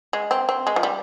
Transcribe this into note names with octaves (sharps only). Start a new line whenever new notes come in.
G#3
C4
C4
G#3
F3
G3